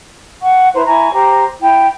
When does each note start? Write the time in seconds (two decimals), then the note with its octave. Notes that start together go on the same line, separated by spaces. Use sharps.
0.42 F#5 C#6
0.75 E4 B4 C5 A#5
0.87 E4 G#5 A#5 C#6
1.14 G4 C5 A#5
1.61 E4 G5